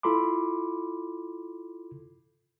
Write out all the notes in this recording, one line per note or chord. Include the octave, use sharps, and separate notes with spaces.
E4 F4 A4 B5 C6 D6